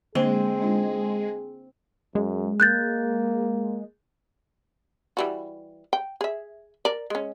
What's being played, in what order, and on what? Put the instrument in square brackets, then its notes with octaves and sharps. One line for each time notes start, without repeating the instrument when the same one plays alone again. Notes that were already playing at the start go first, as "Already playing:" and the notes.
[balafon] D3 A#3 D4 [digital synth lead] G#3 [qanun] C4 [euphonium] G#4
[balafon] D4 D#4 F4
[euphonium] F#2 [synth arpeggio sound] G#3
[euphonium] A#3 [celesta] F#6 G6 A6
[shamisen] E3 G3 F#4
G5
G#4 E5
A#4 D5
G#3 C#4